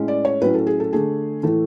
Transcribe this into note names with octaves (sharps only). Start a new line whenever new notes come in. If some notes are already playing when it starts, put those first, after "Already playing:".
Already playing: A2 G#3 C#4
D5
C#5
A2 F#3 C#4 B4
A4
G#4
A4
D3 A3 D4 G#4
A2 E3 A3 A4